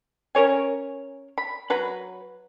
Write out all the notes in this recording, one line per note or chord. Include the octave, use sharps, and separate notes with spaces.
C#4 A#4 C#5 G#5
B5
F#3 B4 A#5